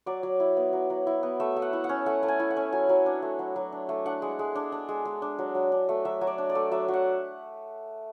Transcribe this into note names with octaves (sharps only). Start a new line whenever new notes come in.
F#3 D5
F#3
E4
B3
F#3
F#3
E4
B3
A3 E5
A3
F#5
E4
F#5
C#4
A3 F#5
A3
G#5
E4
F#5
C#4
F#3 G#5
F#3
D4
A3
F#3
F#3
D4
A3
D4 F#5
G#3
G#3
D4
D4
G#3
G#3
D4
F#3
F#3
D4
A3
F#3 E5
F#3
D5
D4
D5
A3
F#3 E5
F#3
F#5